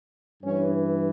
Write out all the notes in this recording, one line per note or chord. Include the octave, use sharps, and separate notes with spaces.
G2 E3 C#4